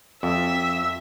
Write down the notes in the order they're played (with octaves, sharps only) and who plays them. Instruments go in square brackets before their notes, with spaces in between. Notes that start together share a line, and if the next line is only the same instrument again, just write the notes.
[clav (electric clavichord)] F2 [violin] E5